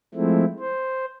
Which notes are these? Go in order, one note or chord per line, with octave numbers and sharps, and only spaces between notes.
F3 G#3 A3 C4 E4
C5